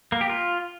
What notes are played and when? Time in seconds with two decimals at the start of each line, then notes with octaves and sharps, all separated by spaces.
0.12 A#3
0.21 G4
0.30 F4